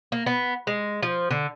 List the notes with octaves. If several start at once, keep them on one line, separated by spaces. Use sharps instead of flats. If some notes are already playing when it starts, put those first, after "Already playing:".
A#3
B3
G#3
F3
D3